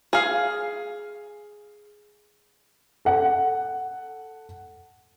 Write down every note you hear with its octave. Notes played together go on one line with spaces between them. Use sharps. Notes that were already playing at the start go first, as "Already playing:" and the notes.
G#4 F5
A4 F#5